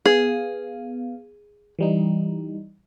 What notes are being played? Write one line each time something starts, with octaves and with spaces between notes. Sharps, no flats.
B3 G#4 F5
E3 G3 D#4